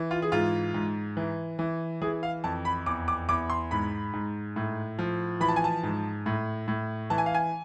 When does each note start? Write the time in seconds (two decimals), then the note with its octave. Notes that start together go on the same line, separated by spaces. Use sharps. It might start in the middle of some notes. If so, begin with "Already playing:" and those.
Already playing: E3
0.11 F4
0.22 G#4
0.32 G#2 F4
0.74 G#2
1.17 E3
1.59 E3
2.01 E3 G#4
2.23 F5
2.44 F2 A5
2.65 B5
2.86 E2 D6
3.08 D6
3.29 E2 D6
3.50 C6
3.71 G#2 B5
4.13 G#2
4.56 A2
4.99 F3
5.40 E3 B5
5.49 A5
5.56 G#5
5.64 A5
5.83 G#2
6.26 A2
6.68 A2
7.10 E3 A5
7.18 G#5
7.26 F5
7.34 G#5